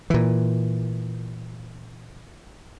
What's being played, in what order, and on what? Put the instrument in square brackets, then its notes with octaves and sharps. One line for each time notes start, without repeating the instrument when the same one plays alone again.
[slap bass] A#2 E3